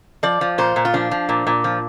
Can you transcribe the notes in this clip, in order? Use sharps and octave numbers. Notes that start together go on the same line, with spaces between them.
F3 D5
F3
A#2 C5
A#2
F4
F3 D4
F3
A#2
A#2
F3